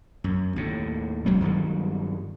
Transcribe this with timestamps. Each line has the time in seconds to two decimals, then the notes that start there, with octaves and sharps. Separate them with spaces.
0.24 F#2
0.56 D#2 A2
1.26 F#3 G#3 C4
1.41 G2 D#3 F#3 G3